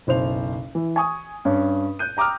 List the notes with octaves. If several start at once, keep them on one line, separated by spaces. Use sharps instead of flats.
F#1 B1 C5 F7
E3
G#5 C#6 D#6
G2 C#4
F#6 G6 D#7
G5 A#5 D6 D#6 F6